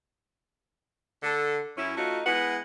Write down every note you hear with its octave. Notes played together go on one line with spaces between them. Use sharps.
D3 A4
F#2 C#4 E4
A3 D#4 F4 F#4
G#3 B3 E4 F#5